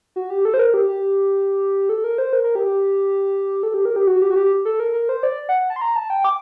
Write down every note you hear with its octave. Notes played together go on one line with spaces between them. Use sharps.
F#4
G4
A4
C5
A#4
G4
G4
A4
A#4
C5
A#4
A#4
G4
G4
A4
G4
A#4
G4
F#4
G4
F#4
G4
A4
A#4
A#4
C5
D5
F#5
A5
C6
A#5
A5
G5
D6